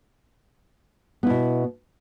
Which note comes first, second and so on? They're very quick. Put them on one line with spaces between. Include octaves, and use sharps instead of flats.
B3 E4 B2